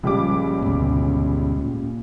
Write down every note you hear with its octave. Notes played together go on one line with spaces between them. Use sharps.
C#2 A#2 F3 G3 C#4 D6
D2 G#2 B2
A#2